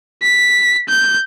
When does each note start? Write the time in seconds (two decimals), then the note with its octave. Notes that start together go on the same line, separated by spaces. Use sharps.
0.22 B6
0.89 G6